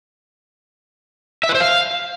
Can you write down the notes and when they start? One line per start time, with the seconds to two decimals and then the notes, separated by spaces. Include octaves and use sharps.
1.44 E5
1.49 B4
1.55 C5
1.60 F5